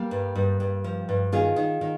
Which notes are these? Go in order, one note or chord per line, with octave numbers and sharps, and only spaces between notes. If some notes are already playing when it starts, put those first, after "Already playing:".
Already playing: G3 A#3
G2
G2
G2
F3
G2
D#3 F4 G#4
D#3
D#3